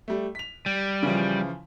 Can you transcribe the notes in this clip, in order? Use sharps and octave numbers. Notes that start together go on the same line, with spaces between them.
G3 A3
B6 F7
G3
C#3 E3 F3